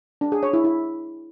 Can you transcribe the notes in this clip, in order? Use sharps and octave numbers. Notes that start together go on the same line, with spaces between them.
D4
G#4
C#5
E4
E4